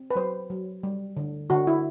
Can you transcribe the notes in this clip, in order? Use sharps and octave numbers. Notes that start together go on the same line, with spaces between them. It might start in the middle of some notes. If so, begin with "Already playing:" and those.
Already playing: C4
B4
F#3 C5
F#3
G3
D3
D3 F#4
E4